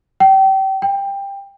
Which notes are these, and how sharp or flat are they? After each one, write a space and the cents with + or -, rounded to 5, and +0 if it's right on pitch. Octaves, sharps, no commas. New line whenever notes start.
G5 -30
G5 +15